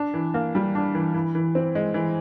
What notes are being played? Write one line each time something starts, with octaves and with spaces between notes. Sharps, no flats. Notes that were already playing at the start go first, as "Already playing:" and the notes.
Already playing: D4
E3
A#3
G3
D4
E3
E3
E3
C4
G#3
E3